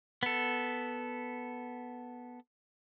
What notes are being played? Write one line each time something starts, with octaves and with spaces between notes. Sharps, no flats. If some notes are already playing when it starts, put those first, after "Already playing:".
B3 A4